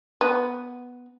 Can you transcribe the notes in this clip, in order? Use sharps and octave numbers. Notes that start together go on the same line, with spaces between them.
B3